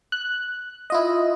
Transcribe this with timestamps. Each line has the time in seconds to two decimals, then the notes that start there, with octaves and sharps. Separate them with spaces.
0.12 F#6
0.90 E4 F4 D#5